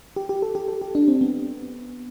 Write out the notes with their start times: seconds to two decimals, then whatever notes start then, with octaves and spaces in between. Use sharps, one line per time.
0.16 G4
0.29 G4
0.42 A4
0.55 G4
0.68 A4
0.82 G4
0.95 D4
1.08 C4
1.21 B3